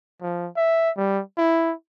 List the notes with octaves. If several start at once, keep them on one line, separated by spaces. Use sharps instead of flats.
F3
E5
G3
E4